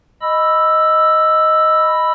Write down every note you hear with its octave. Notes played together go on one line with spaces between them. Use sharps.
D#5 B5 E6